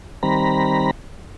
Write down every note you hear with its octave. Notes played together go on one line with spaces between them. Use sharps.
D#3 G3 C4 A#5 B5